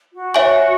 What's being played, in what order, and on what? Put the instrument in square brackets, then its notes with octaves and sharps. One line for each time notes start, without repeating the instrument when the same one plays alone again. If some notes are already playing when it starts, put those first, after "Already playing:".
[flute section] F#4
[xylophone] C#5 E5 G#5 C#6